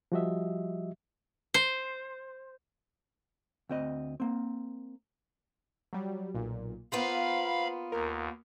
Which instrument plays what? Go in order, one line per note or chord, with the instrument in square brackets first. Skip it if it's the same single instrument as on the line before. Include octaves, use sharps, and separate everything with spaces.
[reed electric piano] F3 G3 F#4 G4 D#5 E5
[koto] C5
[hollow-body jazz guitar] D2 C4 D#5
A#3 C4
[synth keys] F#3 G3
B1 A#2
[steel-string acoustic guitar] A#3 B3 F4 [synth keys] C5 [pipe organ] F5 B5
[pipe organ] D#2 [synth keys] A#4